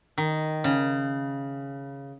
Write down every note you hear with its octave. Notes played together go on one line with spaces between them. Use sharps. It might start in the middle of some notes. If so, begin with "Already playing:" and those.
D#3
C#3